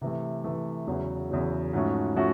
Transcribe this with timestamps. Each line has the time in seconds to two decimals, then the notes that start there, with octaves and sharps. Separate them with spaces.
0.01 C3 E3 A3
0.44 C3 E3 A3
0.87 E2 C#3 F#3
1.30 E2 C#3 F#3
1.73 G#2 F3 A3 C#4 F#4
2.16 F3 A3 C#4 F#4